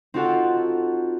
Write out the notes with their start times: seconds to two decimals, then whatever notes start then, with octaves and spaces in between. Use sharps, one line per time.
0.14 C4 D#4 F4 F#4 A4 F#5